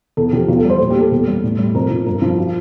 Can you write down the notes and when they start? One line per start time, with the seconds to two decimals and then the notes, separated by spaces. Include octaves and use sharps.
0.17 E2 A4
0.32 F3 G4
0.48 E2 F4
0.59 A4
0.64 G3
0.70 C5
0.80 A#2
0.90 G4
0.96 A#2 A4
1.11 E2
1.27 G3
1.43 A2
1.58 G3
1.75 F2 A#4
1.90 F3
2.06 G2 A#4
2.22 F3
2.38 F4